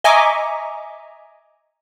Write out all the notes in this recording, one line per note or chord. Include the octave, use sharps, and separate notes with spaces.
D#5 E5 G#5 A#5 C#6 D6